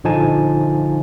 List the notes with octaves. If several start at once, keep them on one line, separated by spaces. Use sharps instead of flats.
A#1 D3 F3 D#4 G#5 A5